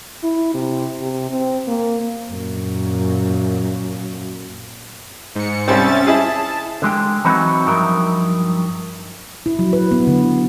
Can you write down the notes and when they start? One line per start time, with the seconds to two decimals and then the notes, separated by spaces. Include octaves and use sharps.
0.23 E4
0.54 C3
1.01 C3
1.30 C4
1.67 A#3
2.31 F#2 A#2
5.35 G#2 C#7
5.68 C2 G3 C4 C#4 E5 A6
6.07 E4 G#4 A5
6.82 D3 G#3 G4
7.25 E3 F#3 C4 D#4 F#4 B4
7.66 G2 F3 F#3 D#4 A#4 E5
9.46 E4
9.59 F#3
9.73 B4
9.91 B3
10.07 D3
10.24 E4